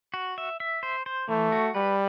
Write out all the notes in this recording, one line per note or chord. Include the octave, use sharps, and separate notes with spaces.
F#4
E5
E5
C5
C5
E3 A3
F#4
G3 B4